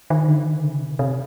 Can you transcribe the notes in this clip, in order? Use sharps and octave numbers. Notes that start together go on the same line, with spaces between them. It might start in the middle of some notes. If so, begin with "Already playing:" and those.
D#3
D3
D#3
C#3
C3
C3